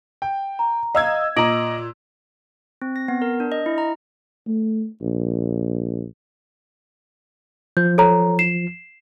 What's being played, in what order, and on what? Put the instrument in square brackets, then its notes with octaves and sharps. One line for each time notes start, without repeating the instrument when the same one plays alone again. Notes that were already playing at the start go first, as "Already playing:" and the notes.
[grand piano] G5
[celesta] A#5
[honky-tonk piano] D#5 G#6 [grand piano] F5 E6
[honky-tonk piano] A#2 [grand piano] D#5 A#5 [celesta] D6 D7 F#7
[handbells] C4
A#6
B3
A#4
D4
D#5
E4
A#5
[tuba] A3
A#1
[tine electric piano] F3 [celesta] G6
[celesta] A4 C#5 A#5
C7 E7